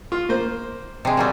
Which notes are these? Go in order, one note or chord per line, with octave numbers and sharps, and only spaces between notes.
F4
A#3 C5
C3 G#3
A#2 F#3 G3